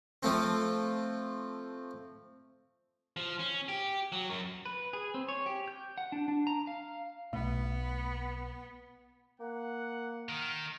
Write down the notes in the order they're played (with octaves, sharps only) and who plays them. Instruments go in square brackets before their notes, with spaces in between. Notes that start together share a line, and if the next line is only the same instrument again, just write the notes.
[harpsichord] F3 A3 C4
[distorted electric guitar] F3
C#4
G4
F#3
F#2
[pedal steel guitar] B4
G#4
C4
C#5
G4
G6
F#5
D4
D4
A#5
F5
[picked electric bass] B1 B2 [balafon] A3 [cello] B3
[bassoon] A#3 [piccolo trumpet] F#5
[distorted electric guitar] D#3 [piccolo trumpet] F6